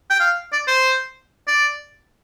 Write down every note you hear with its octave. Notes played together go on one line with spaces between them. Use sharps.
G5
F5
D5
C5
D5